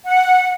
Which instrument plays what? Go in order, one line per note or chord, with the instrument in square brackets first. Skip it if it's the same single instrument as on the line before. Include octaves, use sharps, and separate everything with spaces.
[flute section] F#5